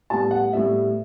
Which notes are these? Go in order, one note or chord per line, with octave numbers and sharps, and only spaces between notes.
A2 G3 B3 A5
F#5
A2 G3 B3 E5